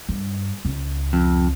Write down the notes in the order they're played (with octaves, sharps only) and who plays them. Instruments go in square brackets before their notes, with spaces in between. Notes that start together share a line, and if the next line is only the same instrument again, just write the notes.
[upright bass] G2
C#2
[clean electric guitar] F2